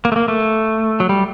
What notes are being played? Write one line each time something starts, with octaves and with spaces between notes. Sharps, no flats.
A#3
A3
A#3
A3
F#3
G3